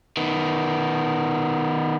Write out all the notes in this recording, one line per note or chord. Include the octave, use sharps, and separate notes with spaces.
D#3 B3